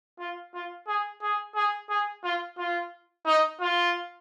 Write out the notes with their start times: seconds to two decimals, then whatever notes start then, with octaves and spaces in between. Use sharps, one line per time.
0.19 F4
0.54 F4
0.88 G#4
1.22 G#4
1.55 G#4
1.89 G#4
2.24 F4
2.58 F4
3.26 D#4
3.60 F4